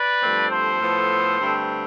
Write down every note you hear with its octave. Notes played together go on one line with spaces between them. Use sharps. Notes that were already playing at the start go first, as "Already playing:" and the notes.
Already playing: B4 D5
G2 F3 A3 C4
A4 C5
A2 F3 B3
G2 D3 A3 C4